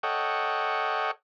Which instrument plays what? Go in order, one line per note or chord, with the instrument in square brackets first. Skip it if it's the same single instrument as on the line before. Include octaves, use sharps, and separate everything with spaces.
[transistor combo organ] A4 C#5 D#5 F#5 G5